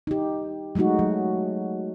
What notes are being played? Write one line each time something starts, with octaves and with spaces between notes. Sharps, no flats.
D#4 G4
F#3 G#3 A3 D#4 F#4
F#3